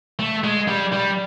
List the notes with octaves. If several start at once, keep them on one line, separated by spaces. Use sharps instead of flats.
A3
G#3
G3
G3